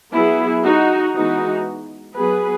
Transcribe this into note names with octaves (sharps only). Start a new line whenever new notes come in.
F#3 B3 E4 G#4
D#4 F#4
E3 G#3 B3 D#4 F#4
F#3 B3 G#4 B4